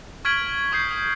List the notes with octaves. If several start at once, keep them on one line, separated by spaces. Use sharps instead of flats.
C#6 F6 G#6 B6 D7 F#7
C#6 D#6 G6 C7
D#6